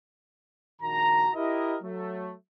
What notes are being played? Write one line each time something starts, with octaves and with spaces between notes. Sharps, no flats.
A#1 D#3 F#4 A5 A#5
E4 G4 A#4 D#5
F#3 A3